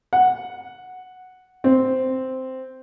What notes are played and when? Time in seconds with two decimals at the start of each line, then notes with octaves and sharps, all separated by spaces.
0.13 F#5
1.64 C4